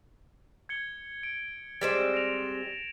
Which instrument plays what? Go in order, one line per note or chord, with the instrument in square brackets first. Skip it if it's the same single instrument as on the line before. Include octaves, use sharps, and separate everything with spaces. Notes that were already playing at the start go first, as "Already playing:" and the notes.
[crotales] G#6 C#7 G7
D7
[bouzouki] G3 G#3 C4 [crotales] A6 D7 E7
[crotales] A#6 D7 F7